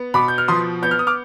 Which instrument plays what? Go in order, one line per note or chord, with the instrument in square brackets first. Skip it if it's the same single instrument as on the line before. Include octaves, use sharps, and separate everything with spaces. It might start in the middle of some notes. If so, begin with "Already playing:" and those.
Already playing: [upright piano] B3
B2 B5 D6
G6
F6
F3 C6 D#6
B3 G6
F6
D#6
D6 F6